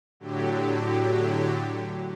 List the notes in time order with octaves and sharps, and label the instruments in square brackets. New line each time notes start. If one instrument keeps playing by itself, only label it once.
[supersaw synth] A2 D3 F#3 G4